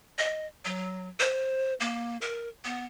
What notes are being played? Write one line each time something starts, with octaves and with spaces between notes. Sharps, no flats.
D#5
F#3
C5
A#3
A#4
B3